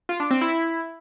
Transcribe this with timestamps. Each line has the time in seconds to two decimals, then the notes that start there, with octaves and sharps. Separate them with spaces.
0.09 F4
0.20 D4
0.31 C4
0.41 E4